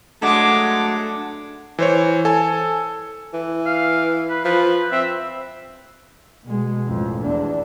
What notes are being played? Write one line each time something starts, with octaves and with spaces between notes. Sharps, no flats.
F#3 G#3 A3 D4 F#4 D6
E3 C5 C#5
A4 G#5
E3
F5
B4
F3 B4
C4 E5
B2 G#3
A1 F2
E2 D4